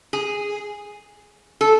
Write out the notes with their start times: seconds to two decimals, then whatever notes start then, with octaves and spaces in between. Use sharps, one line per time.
0.13 G#4
1.61 A4